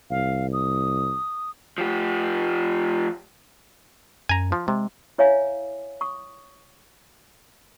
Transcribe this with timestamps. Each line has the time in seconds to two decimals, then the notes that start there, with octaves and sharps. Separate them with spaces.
0.10 C2 F5
0.53 D#6
1.78 F3 G4
4.29 F#2 G#5 A#5
4.52 F3
4.68 C3 G#3
5.18 E4 C#5 E5 F5 G#5
6.01 C#6 D#6